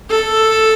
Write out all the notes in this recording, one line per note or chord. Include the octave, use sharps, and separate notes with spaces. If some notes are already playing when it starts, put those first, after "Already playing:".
A4